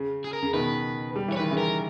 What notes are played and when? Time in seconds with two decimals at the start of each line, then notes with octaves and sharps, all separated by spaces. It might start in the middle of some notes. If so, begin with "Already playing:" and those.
Already playing: C#3
0.24 G#4
0.33 A#4
0.43 C#3
0.54 B2 D#3 B4
1.16 G3
1.28 E3 C#5
1.37 D#3 B4
1.51 C#3 E3
1.58 A#4